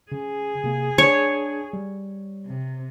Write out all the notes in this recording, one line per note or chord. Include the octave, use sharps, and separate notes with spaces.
C#3 G#4
C3 A#3
D4 C#5
G3
C3